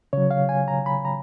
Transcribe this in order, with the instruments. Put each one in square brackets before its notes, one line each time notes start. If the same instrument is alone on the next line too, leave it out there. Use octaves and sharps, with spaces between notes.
[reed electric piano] C#3 F#3 C#5
F5
G#5
A#5
B5
A#5